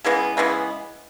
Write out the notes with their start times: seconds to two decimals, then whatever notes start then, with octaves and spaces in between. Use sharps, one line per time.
0.04 C#3 E3 G#3 B3
0.37 C#3 E3 G#3 B3